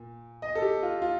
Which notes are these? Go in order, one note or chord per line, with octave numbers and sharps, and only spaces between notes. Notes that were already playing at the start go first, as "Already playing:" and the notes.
Already playing: A#2
D#5
A4
G4
F4
F4